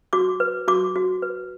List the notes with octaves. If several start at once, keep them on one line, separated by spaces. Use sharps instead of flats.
F#4 D6
B4
F#4 D6
F#4
B4